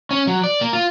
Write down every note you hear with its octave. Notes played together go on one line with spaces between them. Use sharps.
C#4
F#3
D5
A#3
F4